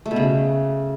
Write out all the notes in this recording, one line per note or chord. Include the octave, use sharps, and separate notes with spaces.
A3
B2
C#3